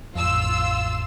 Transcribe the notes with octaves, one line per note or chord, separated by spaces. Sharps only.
A1 F2 F4 E6